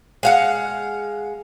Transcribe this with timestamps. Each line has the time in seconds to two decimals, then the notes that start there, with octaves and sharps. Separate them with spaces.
0.23 G#3 F5 F#5